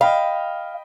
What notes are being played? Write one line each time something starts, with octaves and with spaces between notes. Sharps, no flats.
D#5 F5 G5 B5